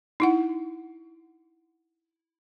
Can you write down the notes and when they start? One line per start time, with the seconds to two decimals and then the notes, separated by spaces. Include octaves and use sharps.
0.20 D#4 E4 F#5